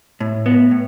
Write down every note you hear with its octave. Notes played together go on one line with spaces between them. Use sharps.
A2
B3
A2